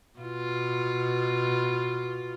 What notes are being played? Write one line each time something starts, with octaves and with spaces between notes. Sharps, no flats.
B2 F4